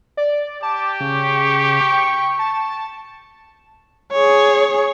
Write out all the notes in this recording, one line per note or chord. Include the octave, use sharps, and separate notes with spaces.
D5
G4 A5 D6
C#3 C#6
G5
A5
G#4 C#5